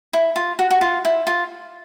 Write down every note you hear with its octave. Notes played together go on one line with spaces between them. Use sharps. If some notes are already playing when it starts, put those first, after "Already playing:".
E4
F4
F#4
F#4
F4
E4
F4